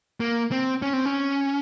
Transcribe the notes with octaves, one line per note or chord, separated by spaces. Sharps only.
A#3
C4
C#4
C4
C#4